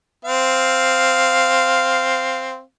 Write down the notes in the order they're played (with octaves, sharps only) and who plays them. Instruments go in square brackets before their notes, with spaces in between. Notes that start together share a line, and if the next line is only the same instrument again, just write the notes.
[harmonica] C4 F5